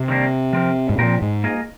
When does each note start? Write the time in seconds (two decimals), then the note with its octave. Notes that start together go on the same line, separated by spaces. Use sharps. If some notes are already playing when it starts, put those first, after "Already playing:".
Already playing: C3
0.08 D#3 G3 A#3 D4
0.53 F3 C4 G4 A#4
0.89 G#2
0.98 A#2 F3 C4 G4 A#4
1.22 G#2
1.44 A#3 F4 G#4 D#5